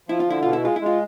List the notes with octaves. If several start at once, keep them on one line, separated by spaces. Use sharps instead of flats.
F3 E4
F4
D3 E4
B2 F4
E4
G#3 F4
E4
G#3 F4